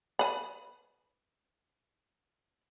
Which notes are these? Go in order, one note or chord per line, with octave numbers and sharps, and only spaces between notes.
B4 B5